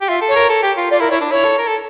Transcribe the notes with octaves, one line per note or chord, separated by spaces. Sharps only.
G4
F4 E5
A4
C#5
A#4
A4
G4
F4
F4 D5
E4 A#4
E4 C#5
D4
E4 C#5
A4
A#4
A4